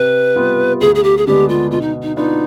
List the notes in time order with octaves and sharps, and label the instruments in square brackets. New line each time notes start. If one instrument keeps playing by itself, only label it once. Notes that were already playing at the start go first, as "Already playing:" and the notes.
Already playing: [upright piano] C3 [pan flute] B4
[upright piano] G3 B3 F4
[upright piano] D2 [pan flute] G#4
[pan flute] G#4
G4
G#4
[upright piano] D3 G#3 B3 D4 [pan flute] G4
[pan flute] F4
[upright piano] B2 [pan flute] F4
[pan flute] D#4
D#4
[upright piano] B3 D4 F4 [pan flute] D#4